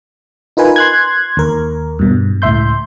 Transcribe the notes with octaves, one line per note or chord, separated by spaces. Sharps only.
D#4 F4 A#4 B4 G#5
C6 F#6 G#6
D#2 A#4
G2 B2
C#2 A2 E5 C6 G6